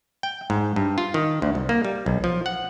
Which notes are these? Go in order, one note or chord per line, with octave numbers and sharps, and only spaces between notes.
G5
G#2
G2
F4
D#3
D2
C2
A#3
G3
B1
F3
F#5